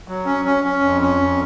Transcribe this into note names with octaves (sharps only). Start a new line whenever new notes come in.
F#3
C#4
C#4
C#4
F2
C#4
F2